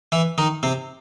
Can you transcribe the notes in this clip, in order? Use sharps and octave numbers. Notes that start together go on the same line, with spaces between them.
E3 E4
D#3 D#4
C3 C4